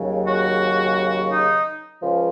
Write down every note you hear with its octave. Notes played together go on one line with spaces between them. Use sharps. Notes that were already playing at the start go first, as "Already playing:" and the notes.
Already playing: D#2 C#3 F#3
F#4
D#4
C#2 C#3 F3